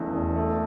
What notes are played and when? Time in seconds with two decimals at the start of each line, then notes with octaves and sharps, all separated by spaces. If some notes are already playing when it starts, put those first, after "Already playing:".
Already playing: E1 E2 C#3 A3
0.12 E1
0.35 A3